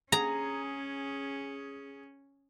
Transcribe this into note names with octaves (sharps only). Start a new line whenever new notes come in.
C#4 G#4 A#5